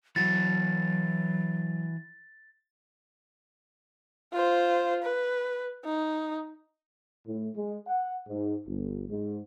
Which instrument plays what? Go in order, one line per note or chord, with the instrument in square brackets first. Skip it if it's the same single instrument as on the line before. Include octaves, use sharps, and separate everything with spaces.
[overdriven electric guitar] E3 F#4 [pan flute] F#3 [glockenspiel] A6
[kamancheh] F4 C5
B4
D#4
[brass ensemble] A2
G#3
F#5
G#2
G1
G#2